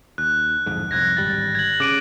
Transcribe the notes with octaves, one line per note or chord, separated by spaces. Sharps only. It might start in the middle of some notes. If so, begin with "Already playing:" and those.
D#2 F#6
D1 F2 G#2
C2 F2 F#6 G#6 A#6
D1 G#1 G3 A6
G#6 F#7
C#3 D6 D7 D#7